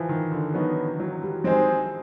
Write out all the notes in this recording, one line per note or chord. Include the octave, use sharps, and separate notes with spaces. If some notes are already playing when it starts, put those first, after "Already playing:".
Already playing: E3 F3
D#3
D3
F#3 B3 D#4 F#4
F#3
G3
G#3 C4 D#4 G#4 C5